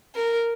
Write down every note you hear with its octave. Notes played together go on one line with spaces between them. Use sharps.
A#4